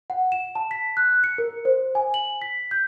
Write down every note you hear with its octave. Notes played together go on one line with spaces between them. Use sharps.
F#5
E7
A5
B6
F#6
C#7
A#4
C5
G#5
F#7
B6
G6